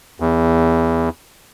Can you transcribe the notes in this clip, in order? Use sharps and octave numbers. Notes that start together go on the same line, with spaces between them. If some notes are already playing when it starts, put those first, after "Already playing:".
E2